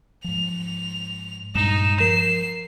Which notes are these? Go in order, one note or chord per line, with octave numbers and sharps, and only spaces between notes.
G#2 F3 F7
G2 A#2 G3 G#3 D#4 E7
F3 A#4 C7